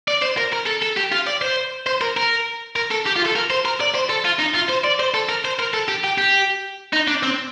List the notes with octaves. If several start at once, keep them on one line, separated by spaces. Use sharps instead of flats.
D5
C5
A#4
A#4
A4
A4
G4
F4
D5
C5
C5
A#4
A#4
A#4
A4
G4
F4
A4
A#4
C5
A#4
D5
C5
A4
F4
D#4
F4
C5
D5
C5
A4
A#4
C5
A#4
A4
G4
G4
G4
D#4
D4
C4